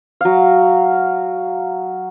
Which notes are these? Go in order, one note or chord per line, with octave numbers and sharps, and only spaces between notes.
F#3 F5